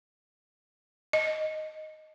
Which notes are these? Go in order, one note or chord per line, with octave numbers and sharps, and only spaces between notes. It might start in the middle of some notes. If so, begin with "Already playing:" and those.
D#5